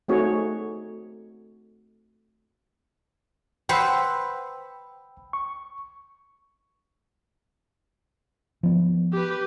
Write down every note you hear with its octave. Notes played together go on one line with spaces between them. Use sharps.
A3 C4 D#4 F#4 G#4 C#5
B4 C5 F#5 G5 B5 E6
C#6
F3 B3
G4 B4